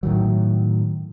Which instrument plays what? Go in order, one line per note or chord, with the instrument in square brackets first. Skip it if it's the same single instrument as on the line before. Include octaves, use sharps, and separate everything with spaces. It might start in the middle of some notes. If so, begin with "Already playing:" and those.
[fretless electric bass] A2 D#3 F#3